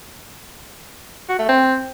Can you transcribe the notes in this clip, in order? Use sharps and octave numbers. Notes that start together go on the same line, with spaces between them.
F#4
A3
C4